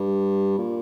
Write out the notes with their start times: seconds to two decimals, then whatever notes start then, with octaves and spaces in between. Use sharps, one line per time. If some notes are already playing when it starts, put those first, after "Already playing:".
Already playing: G2
0.58 A#2